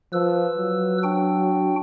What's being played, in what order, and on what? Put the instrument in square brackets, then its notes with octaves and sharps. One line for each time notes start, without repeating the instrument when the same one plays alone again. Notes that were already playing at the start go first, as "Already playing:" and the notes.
[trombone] F3 [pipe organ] B4 E6
[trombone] F#3
[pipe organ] D4 F#4 G5